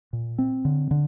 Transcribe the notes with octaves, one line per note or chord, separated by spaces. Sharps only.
A#2
C4
D3
D3